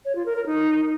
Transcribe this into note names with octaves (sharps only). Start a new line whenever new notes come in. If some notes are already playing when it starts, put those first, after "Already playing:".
C#5
F4
A#4
A#4
D#4